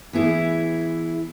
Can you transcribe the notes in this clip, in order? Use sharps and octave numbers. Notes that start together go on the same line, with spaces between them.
E3 B3 E4 G#4